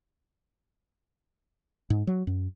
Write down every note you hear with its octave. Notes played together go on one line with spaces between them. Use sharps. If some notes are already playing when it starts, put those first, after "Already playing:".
G#2
F#3
F#2